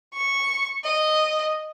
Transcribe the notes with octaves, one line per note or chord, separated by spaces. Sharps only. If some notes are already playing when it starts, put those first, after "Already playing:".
C#6
D#5